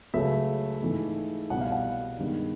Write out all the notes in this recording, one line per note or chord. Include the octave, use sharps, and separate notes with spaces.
C#2 C#3 F#3 A3 E5
G#2 E3 A3
C2 B2 G3 B3 F#5
F5
F#5
G2 D#3 G#3 B3